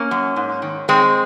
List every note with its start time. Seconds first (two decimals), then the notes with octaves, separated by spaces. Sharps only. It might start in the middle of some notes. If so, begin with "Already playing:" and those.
Already playing: A#3 C#4
0.11 F#2
0.36 G#2
0.62 D#3
0.88 D#3 G#3 C4